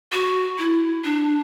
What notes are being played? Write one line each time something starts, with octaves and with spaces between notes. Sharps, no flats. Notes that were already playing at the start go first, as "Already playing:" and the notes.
F#4
E4
D4